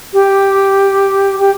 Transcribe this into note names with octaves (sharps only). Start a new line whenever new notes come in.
G4
G4